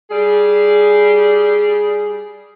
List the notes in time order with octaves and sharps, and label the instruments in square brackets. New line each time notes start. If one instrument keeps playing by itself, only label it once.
[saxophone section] G3 G#4